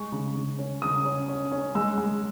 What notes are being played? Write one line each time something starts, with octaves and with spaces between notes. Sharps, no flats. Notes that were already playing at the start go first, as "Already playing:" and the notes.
Already playing: G#3 C#6
C#3
C#3
C#4
C#3 D#6
C#4
C#4
C#4
G#3 E6
G#3